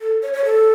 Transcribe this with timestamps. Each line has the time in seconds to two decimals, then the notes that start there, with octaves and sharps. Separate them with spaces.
0.01 A4
0.23 C#5
0.33 C#5
0.45 A4